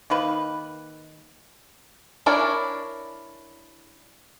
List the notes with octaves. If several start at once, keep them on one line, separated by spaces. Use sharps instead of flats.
D#3 A#3 B4
D4 E4 A#4 C#5 D5